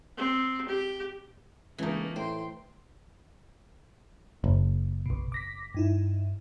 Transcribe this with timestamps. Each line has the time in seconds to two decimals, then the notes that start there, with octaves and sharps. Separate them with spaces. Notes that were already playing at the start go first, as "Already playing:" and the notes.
0.17 C4
0.69 G4
1.78 C#2 E3 A3 A#3 D#4
2.16 A2 C5 G5 C6
4.44 F#1
5.06 B1 B2
5.32 D6 A#6 B6
5.75 G2 D#4 E4